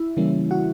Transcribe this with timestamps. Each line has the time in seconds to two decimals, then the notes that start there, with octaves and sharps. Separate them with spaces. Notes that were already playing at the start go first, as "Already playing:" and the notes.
Already playing: E4 E5
0.17 C#3 E3 G3 A#3 C#4
0.51 F#4 F#5